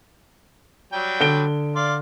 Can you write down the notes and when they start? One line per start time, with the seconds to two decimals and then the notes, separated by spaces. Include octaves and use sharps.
0.92 F#3 G3 G5
1.20 D3 D7 G7
1.75 D5 F5 C6